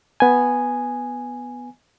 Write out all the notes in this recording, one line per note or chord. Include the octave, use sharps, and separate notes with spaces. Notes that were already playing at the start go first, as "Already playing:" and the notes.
B3 G#5